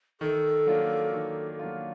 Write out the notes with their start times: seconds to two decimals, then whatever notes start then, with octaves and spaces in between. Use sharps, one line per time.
0.21 D#3 A4
0.67 F#3 A#3 D4 F4
1.14 D#3
1.59 F#3 A#3 D4 F4